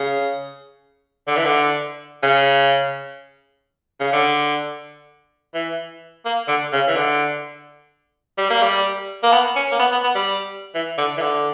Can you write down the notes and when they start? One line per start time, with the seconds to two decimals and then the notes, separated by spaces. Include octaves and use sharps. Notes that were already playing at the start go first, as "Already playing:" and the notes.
Already playing: C#3
1.28 D3
1.37 E3
1.45 D3
2.23 C#3
4.00 C#3
4.13 D3
5.54 E3
6.25 A#3
6.48 D3
6.73 C#3
6.88 E3
6.96 D3
8.38 G3
8.50 A#3
8.63 G3
9.23 A#3
9.33 B3
9.56 C#4
9.72 A#3
9.79 B3
9.92 B3
10.04 B3
10.15 G3
10.75 E3
10.98 D3
11.18 E3
11.21 D3